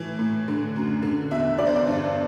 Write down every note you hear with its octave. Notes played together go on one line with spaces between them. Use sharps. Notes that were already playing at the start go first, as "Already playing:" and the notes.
Already playing: A2 E3
A2
D3
F#2
D3
E2 E5
D3 D5
C5
D5
G2